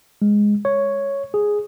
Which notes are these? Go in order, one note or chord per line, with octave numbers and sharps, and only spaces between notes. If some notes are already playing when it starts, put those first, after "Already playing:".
G#3
C#5
G#4